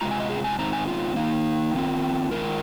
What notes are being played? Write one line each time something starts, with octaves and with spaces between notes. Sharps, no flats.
C3 G#3 F4 A#5
G#5
D#5
G#4
G#5
G#2 D#3 C4 A#5
G#5
F4
D#3 A#3 D#4
D#3 C4 F4
D#3 G#3 F4 A#4